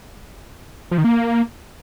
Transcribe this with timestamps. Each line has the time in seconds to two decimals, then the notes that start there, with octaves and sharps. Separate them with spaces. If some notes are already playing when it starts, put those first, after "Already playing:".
0.91 F3
0.98 D#3
1.04 A#3